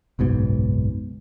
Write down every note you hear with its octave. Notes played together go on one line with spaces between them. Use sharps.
F#1 B1 G#2 B2